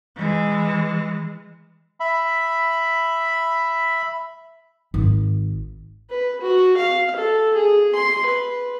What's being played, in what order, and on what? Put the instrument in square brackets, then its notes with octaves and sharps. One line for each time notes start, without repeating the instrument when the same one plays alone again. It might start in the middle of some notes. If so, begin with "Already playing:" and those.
[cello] E3 G#3
[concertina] E5 B5
[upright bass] G#1
[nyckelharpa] B4
F#4
F5
A4
G#4
C6
B4